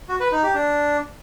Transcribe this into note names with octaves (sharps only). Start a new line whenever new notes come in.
F#4
B4
D#4
G4
D4